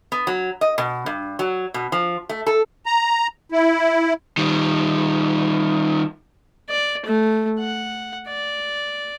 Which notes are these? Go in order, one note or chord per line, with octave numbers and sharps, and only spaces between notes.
B3
F#3
D#5
B2
G2
F#3
B2
F3
A3
A4
A#5
E4
D#3 G3
D5
A3
F#5
D5